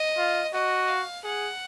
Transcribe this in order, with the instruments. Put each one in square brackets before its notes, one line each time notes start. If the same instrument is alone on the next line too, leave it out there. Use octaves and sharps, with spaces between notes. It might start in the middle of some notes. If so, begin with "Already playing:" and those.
Already playing: [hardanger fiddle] D#5
[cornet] F4
[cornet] F#4 [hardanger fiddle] D#5
[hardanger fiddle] F5
[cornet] G#4 [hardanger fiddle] F#5